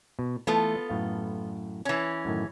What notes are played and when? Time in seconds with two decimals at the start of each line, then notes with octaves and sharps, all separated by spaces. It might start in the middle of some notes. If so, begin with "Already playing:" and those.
0.19 B2
0.47 E3 A3 B3 F4 A4
0.89 F#2 A2 F5
1.85 E3 C#4
2.25 F#2 A2 D#3